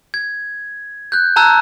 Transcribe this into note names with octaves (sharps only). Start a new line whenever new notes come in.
G#6
F#6 G6
A5 A#5 E6 F#6 G#6